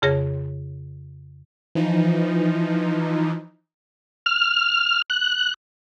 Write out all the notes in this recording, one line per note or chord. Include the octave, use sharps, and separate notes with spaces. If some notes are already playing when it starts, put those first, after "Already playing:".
F2 C#3 G#4 C#5 A#6
E3 F3 D#4
F6
F#6